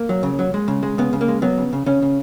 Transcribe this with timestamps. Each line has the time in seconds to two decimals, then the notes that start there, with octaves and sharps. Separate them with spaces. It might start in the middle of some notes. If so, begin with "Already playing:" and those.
Already playing: A#3
0.09 F#3
0.23 C#3
0.39 F#3
0.54 G#3
0.68 C#3
0.83 G#3
0.98 C#3 B3
1.13 C#3
1.21 A#3
1.28 G#3
1.42 F#3 B3
1.58 C#3
1.73 C#3
1.86 C#3 C#4
2.02 C#3